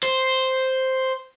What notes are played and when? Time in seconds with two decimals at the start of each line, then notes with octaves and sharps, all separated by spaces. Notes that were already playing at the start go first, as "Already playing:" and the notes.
0.03 C5